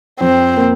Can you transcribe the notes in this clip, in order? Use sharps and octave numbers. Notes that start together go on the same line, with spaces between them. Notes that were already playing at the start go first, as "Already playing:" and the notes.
F2 C4
A#3